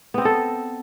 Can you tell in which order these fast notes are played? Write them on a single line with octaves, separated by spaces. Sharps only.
B3 C4 D#5 A4